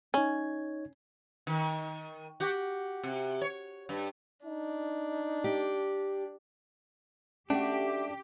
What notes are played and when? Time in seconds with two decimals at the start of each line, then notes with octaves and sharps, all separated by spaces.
0.14 C#4 D#4 C#5 G#6
1.47 D#3
2.40 F#4 G4
3.03 C3
3.41 C#5
3.89 G2
4.45 D4 D#4
5.44 G4
7.50 A3 C#4 D4 F#4 G4